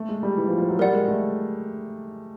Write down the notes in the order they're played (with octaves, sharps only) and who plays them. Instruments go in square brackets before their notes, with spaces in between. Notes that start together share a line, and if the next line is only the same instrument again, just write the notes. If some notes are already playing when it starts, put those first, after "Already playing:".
Already playing: [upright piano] A3
G#3
G3
E3
F3
F3
F#3
[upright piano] G3 [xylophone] A#4 D5 F#5
[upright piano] G#3
A3